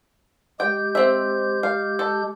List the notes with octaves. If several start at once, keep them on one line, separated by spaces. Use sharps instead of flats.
G#3 G4 G5 G6
C4 E5
F5
A4